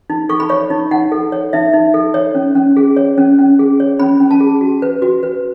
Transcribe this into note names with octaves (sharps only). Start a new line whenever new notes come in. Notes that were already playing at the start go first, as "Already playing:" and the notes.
D#4
A4 C#6
B5
C#5 C#6
D#4
D#4 F#5
A4
C#5
D#4 E5
D#4
A4
C#5
C#4
C#4
G#4
C#5
C#4
C#4
G#4
C#5
C#4 B5
C#4
A5
G#4
F#4
B4
F#4
B4